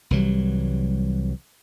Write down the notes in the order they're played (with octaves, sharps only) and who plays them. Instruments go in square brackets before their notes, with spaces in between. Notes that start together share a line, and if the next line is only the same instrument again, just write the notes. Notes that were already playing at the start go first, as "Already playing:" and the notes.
[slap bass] C2 E3 F#3 G3